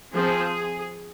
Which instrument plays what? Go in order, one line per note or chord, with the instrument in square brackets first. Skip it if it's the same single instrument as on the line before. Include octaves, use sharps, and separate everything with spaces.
[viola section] F3 C4 G#4